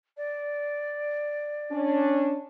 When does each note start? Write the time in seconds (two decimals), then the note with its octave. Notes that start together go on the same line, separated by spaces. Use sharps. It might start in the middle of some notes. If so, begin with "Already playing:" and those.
0.17 D5
1.71 C#4 D4